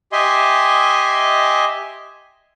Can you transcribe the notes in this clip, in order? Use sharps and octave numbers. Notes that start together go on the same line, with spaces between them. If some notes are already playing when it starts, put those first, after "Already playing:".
G4 D#5 E5 G#5 C6